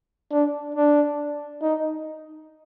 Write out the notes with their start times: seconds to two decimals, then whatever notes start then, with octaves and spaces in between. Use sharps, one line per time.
0.32 D4
0.75 D4
1.62 D#4